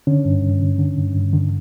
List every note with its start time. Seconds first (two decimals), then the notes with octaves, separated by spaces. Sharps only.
0.07 D3 C#4
0.25 G2
0.43 G2
0.61 D3
0.78 D3
0.98 G2
1.15 G2
1.33 D3